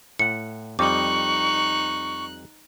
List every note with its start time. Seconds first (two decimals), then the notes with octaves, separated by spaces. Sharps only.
0.19 A2 F#5 C#7
0.79 F2 G3 D#4 D#5 C#6 D6 F#6